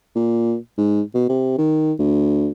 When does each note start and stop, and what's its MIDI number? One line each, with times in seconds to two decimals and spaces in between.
0.15 0.56 46
0.78 1.01 44
1.14 1.27 47
1.29 1.55 48
1.58 1.93 51
1.99 2.51 38